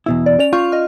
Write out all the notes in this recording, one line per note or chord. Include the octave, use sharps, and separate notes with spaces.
E2 B2 E4
D5
C#4 D5 F7
F4 C#6 G6
D#5 F6